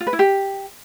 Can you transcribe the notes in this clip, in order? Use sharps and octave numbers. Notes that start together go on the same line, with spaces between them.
F4
B4
E4
G4